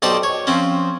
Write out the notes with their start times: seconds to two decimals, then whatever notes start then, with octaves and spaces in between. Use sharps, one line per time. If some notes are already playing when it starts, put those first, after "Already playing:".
0.02 B1 D#4 G4 C5 D5 A5
0.23 C#5
0.47 F3 C4 C#4